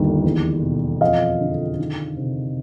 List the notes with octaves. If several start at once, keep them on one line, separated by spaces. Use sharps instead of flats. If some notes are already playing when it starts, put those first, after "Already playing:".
Already playing: G1 D#2 D3
E2
B2
F2 D#5 F5
D3
D#3
C3